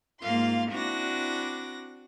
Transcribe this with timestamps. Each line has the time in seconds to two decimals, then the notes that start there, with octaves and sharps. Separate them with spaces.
0.20 G#2 A#3 F4 F5 C6
0.70 C4 D4 E4 F#4 D6 A#6